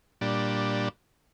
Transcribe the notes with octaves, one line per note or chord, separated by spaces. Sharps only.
A#2 G3 D4